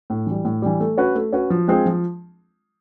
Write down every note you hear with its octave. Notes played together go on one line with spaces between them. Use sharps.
A2
E3 G3
A2
E3 G3
A3
C#4 F#4 B4
A3
C#4 F#4 B4
F3
G#3 C4 F4 G#4
F3